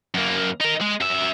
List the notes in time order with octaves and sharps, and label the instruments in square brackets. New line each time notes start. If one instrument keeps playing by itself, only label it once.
[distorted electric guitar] F#2 A#3
D#4 A#4
G#3
F#2 E5